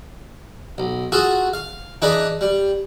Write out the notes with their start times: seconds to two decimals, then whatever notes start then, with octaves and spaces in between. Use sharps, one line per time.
0.78 B1
1.12 F4 F#4 G#4 A4
1.54 F5
2.02 E3 D4 D#4 G#4 B4
2.41 G3